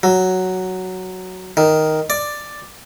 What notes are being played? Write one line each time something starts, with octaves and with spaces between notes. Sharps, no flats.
F#3
D#3
D5